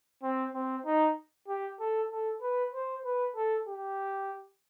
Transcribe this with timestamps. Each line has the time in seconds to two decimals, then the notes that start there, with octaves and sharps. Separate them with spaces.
0.23 C4
0.54 C4
0.86 D#4
1.48 G4
1.80 A4
2.11 A4
2.42 B4
2.74 C5
3.05 B4
3.36 A4
3.68 G4